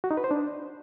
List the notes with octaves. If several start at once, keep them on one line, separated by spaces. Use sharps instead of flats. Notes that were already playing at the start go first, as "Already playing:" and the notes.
F#4
D#4
B4
C5
D4